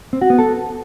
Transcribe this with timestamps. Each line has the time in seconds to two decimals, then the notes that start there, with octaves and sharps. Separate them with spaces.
0.13 C4
0.21 F#4
0.30 B3
0.39 A4